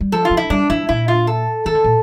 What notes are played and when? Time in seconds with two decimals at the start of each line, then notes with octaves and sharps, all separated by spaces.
0.01 G3
0.12 F3 A4
0.25 F4
0.31 F3
0.37 E4
0.50 G3 D4
0.70 F3 E4
0.89 A#2 E4
1.08 F4
1.27 A4
1.66 E3 A4
1.75 D3
1.84 A#2